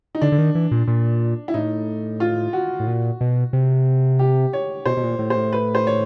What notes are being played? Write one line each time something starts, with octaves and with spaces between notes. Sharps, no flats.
D#4
D3 D4
D3
D#3
E3
A#2
A#2
E4
A2 D#4
F4
F#4
A2
A#2
B2
C3
G4
C#5
B2 C5
B2
A#2
A2
A#2 C5
A2
B4
C5
C#5